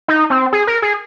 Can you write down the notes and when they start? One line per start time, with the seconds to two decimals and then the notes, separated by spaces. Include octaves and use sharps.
0.08 D#4
0.30 C4
0.53 G#4
0.67 A#4
0.82 G#4